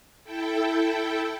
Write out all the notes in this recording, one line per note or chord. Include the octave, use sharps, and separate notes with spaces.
E4 A4 G5